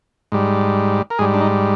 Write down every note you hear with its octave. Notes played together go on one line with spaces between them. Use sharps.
G#2 G3
A#4
G#2 G3 G#4
D4
D#4